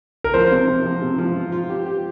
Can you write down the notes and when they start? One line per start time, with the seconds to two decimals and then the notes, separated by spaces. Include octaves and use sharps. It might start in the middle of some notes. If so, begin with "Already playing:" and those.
0.24 A#4
0.34 F3 C5
0.51 C3
0.68 C3
0.85 F3
1.02 C3
1.18 F3
1.36 F4
1.52 F4
1.70 G4
1.86 G4